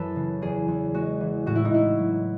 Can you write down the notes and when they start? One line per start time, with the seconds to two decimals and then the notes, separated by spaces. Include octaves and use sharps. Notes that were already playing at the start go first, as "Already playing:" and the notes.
Already playing: F#2 E3 A4 B4
0.16 C#3
0.42 E2 G#4
0.68 E2
0.94 G#3 F#4
1.20 E3
1.46 A2 F#4
1.55 E4
1.65 D#4
1.73 A2 E4
1.99 F#3